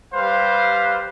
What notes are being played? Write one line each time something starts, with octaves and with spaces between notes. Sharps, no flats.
G3 B4 C5 F5